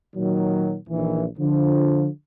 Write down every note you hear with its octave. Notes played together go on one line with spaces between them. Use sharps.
A#2 D#3 F#3
A#1 D#3 E3
D3 F3